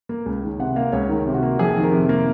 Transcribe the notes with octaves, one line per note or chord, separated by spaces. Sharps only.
A#3
C#2
D#3
C3 F#5
A#3 F5
C#2 C#5
D#3 A#4
C3
F#4
A#3
F2 G#4
D#3
A#4
C3
A#3